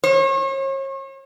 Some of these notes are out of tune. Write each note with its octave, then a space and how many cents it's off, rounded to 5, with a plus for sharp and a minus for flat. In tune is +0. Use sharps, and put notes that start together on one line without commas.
C#5 -40